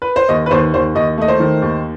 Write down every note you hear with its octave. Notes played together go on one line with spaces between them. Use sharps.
B4
C5
D#2 D#5
B4
D#2 C5
D#2 C5
D#2 D#5
A3 D#5
C5
D#3
D#2